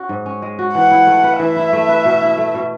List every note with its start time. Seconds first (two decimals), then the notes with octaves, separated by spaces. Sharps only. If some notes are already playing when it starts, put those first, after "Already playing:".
Already playing: C#4 F#4
0.09 G#2
0.26 C#4
0.42 G#3
0.59 F#4
0.74 E3 F#5
0.91 E4
1.07 A3
1.24 B4
1.39 E3 E5
1.57 E4
1.73 A3
1.89 B4
2.05 B2
2.22 E4
2.38 A3
2.54 B2